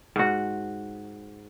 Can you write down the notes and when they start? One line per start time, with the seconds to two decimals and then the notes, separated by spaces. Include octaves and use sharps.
0.16 G#2 F#4